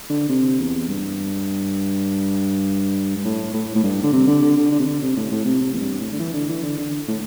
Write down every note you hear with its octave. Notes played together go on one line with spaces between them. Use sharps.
D3
C3
E2
G2
G2
A2
A2
A2
G2
D3
C3
D3
D3
D3
D3
C3
D3
C3
A2
A2
C3
C3
E2
G2
A2
D3
E3
D3
E3
D3
D3
A2